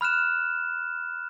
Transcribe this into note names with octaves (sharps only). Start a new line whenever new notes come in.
B5 F6 F#6 E7